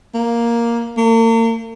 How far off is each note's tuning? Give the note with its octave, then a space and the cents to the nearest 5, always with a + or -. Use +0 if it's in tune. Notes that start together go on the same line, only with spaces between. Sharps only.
A#3 +5
A#3 -40